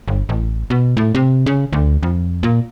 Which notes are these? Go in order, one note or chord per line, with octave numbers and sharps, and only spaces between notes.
G1
A1
B2
A2
C3
C#3
D2
F2
A#2